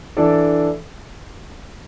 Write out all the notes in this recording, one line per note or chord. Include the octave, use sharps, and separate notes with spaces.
E3 D4 A4 D5